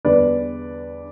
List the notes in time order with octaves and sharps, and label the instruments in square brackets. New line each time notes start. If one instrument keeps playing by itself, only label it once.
[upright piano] E2 D3 G3 B4 D5